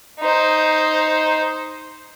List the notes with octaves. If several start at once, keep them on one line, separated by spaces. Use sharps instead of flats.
D#4 C5